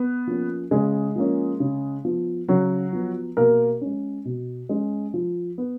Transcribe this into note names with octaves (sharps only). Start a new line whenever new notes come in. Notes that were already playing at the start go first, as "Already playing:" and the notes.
Already playing: B3 B4
F3 A#3 C#4
C#3 G#3 G#4
F3 A#3 C#4
C#3
F3 B3
C#3 F#3 F#4
F3 B3
B2 A#3 A#4
G#3 C#4
B2
G#3 C#4
F3
B3